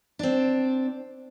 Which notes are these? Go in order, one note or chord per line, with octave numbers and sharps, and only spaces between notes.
C4 D4